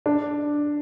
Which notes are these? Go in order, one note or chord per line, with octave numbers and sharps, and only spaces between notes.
D4